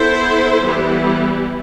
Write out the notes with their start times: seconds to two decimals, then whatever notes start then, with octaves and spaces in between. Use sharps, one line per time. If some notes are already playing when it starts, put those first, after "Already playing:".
Already playing: B3 E4 A4 C5
0.62 E3 G3 B3 E4